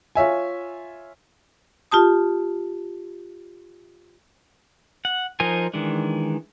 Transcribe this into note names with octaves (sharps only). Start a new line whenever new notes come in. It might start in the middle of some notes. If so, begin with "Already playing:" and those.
F4 C#5 E5 G#5
F4 G4 A5 D#6
F#5
F3 D#4 A#4 C5 G#5
D#3 E3 G#3 D4